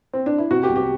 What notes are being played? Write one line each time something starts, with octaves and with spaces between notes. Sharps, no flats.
C4
D4
E4
C3 F#4
G4
C2
G4